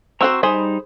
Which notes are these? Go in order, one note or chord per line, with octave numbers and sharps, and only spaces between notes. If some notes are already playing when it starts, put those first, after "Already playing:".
C4 F#4 C5 A#5 C#6 E6
G3 D#4 G#4 C5 B5